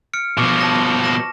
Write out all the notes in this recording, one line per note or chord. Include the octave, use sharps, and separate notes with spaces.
F6 C#7 D7
B2 F3 C#6 D6
A5 A#6
A#6 E7